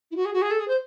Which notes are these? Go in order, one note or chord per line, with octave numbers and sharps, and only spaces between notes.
E4
F#4
G#4
F#4
G#4
A4
G#4
C5